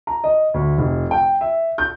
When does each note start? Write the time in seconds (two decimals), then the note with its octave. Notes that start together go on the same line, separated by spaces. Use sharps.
0.07 A#5
0.24 D#5
0.54 D2
0.78 F1
1.11 G5
1.41 E5
1.78 G6